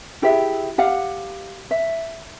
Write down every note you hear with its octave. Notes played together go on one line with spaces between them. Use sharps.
E4 G4 G#4 E5
G4 F5 F#5
E5